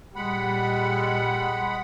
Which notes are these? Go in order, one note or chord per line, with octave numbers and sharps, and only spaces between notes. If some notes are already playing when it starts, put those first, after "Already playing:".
A#2 G3 G#3 F#5 B5